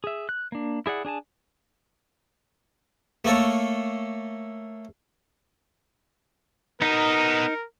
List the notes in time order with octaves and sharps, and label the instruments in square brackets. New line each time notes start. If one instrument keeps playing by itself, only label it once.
[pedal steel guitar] G#4 E5
F#6
A#3 D4
E4 G#4 D5 F#5
D4 G#4 G#5 A5
[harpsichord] A3 A#3 A4 C#5
[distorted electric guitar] B3 D#5 [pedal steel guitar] D#4 [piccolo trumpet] A#4